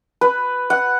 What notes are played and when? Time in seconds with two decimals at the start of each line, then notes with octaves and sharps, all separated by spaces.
0.21 B4
0.70 F#5